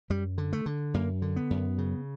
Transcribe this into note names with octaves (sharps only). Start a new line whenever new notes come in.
F#2 G3
D3
A3
D3
F#2 A#3
D3
B3
F#2
C#3